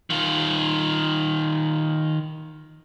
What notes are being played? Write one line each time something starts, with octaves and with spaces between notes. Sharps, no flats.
D#3 F4